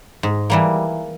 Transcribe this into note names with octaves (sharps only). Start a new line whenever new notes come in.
G#2
E3 G3 A#3